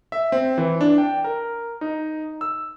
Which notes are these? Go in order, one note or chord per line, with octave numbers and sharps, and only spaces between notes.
E5
C4
E3
D4
G5
A#4
D#4
E6